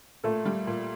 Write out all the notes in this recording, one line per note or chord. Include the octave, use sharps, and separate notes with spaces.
A#2 A3 A4
G3
A#2